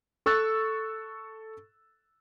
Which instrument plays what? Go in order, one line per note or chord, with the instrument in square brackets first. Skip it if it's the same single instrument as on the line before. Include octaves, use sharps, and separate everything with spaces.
[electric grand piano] A4 C#6 E6 F#6 A6